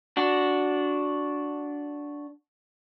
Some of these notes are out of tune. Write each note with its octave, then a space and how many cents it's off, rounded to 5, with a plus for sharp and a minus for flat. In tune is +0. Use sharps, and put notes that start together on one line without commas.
D4 -10 F#4 -5